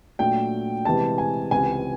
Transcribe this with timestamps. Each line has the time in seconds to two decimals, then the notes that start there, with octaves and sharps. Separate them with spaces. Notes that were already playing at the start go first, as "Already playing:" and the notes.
0.19 A#2 F#3 A3 D4 G5
0.85 C3 E3 G#3 A5
1.18 G#5
1.51 C#2 C3 E3 G#5